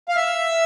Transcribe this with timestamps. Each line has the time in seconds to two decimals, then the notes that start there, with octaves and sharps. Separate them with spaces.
0.09 F5
0.16 E5